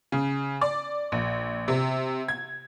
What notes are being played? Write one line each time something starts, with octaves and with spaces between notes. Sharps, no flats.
C#3
D5
A#1
C3
G#6